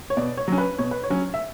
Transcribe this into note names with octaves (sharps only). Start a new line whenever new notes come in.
C#5
B2 D5
C#5
F#3 C#4
B4
B2 C#5
B4
C#5
F#3 C#4
E5